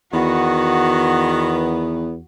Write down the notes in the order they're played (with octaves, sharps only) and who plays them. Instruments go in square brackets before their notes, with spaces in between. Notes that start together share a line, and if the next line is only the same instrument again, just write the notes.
[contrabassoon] E2 [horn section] D#3 B3 [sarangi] F#4